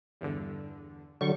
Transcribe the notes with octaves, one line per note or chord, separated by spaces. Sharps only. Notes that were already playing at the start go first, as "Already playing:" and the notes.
E2 G2 D3
D3 F#3 G3 C#6